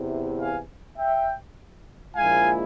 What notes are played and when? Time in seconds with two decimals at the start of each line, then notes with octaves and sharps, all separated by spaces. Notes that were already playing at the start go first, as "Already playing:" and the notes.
Already playing: E2 C3 E3
0.40 F5 G#5
0.98 E5 G5
2.15 A#1 A#2 F3 G#3 E4 F5 G#5